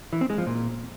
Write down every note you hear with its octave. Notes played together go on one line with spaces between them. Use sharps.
E3
C4
G#3
F3
A#2